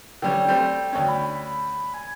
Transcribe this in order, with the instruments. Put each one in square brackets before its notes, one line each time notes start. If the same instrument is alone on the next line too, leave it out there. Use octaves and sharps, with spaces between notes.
[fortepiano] D3 G3 C#4 [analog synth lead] G5
[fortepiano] G3 A3 C4
D2 C#4
[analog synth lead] B5
G#5